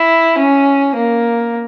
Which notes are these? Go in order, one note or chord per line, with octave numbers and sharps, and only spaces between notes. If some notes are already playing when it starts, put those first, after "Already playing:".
Already playing: E4
C#4
A#3